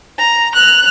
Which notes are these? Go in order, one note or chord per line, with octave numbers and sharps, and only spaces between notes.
A#5
F#6 F7